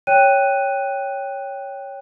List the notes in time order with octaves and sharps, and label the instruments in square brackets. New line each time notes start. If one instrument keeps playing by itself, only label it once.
[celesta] C#5 G5 F#6 D#7